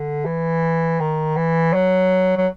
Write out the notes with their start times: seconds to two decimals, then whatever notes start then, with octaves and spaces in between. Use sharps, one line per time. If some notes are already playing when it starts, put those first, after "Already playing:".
Already playing: D3
0.25 E3
1.00 D#3
1.37 E3
1.74 F#3
2.37 F#3